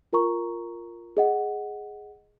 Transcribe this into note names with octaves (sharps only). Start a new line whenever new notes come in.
F4 A#4 A#5 C#6
G#4 D#5 F#5